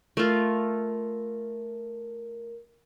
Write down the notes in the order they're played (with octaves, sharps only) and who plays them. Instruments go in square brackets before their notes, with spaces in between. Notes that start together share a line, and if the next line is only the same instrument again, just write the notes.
[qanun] A3 F4 [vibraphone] A#4